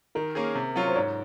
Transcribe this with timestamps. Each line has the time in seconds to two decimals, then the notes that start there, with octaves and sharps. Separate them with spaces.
0.15 D#3 A#4
0.35 A#3 C#4 G#4
0.55 C3
0.76 F#3 C#4 F4
0.88 C5
0.96 G#2 C#5